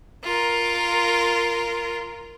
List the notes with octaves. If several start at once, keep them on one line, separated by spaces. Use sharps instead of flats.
F4 A#4